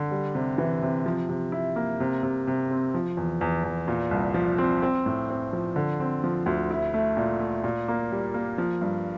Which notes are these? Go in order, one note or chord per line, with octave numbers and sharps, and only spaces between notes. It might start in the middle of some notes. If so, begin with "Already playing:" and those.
Already playing: D3
G3
C3
E3
C3
F3
C3
E4
A#3
C3
C3
C3
C4
F3
E2
E2
E2
A#2
C2
F3
C4
C4
A2
C4
F3
D3
C4
F3
D2
E4
A3
A#2
A3
A#2
A#3
G3
A#3
F3
G2